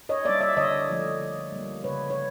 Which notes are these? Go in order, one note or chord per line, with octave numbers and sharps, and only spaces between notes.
C#5 D#5
G3 A#3 D5 E5
D5 E5
D3 C#5 D#5
F3 A3
D3
G3 A#3
C#3 B4 C#5
C#5